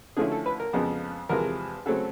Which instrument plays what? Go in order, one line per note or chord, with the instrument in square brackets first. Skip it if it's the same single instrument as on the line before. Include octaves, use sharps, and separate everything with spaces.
[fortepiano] D3 F3 A3 C#4 E4 G#4
A4
B4
A#4
F2 C#3 F3 G#3 B3
E2 C3 F3 G#3 A#4
C#3 F#3 A3 C4 A4